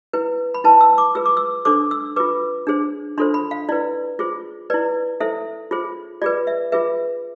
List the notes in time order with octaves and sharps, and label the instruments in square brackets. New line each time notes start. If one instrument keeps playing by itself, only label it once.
[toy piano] E4 B4
B5
E4 B4 A5
E6
D6
F4 G#4 B4 E6
D6
E6
D4 A4 C5 D6
E6
F4 B4 D6
D4 G#4 C5
D4 F4 A4 C5 C6
B5
F5
E4 B4 D5
F4 G#4 C5
E4 B4 D5
E4 A4 C5 E5
F4 G#4 C5
F4 G#4 B4 D5
E5
F4 G#4 B4 E5